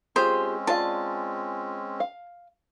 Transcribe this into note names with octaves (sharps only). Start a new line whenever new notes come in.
G#3 C4 C#4 F4 G4 G#4 C5
F4 D5 F5 A5
F5